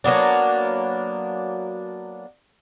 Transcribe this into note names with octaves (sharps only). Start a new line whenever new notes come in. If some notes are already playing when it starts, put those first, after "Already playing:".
F#3 A#3 B3 D4